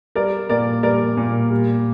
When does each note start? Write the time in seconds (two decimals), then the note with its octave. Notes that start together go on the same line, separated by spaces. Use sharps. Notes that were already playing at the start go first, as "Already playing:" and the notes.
0.16 G3 A#4 D5
0.49 A#2 A#4 D5
0.83 G3 A#4 D5
1.17 A#2
1.51 G3